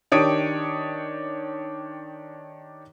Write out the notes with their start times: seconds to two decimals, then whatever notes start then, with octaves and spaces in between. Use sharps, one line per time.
0.12 D#3 D4 G4 C#5 D#6 D7